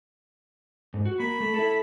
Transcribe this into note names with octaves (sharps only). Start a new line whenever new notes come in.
G#2
F#4
A#3 B5
A3
E4 A4